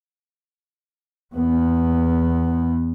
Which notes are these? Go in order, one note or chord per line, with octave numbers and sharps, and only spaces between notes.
E2 B3